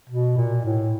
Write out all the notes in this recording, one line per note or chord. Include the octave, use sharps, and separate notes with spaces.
B2
A#2
A2